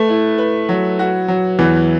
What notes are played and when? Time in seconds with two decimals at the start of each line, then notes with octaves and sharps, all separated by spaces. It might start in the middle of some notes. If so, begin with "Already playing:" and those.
Already playing: A3 B4
0.09 E4
0.38 B4
0.69 F#3
0.99 F#4
1.28 F#3
1.59 E2 E3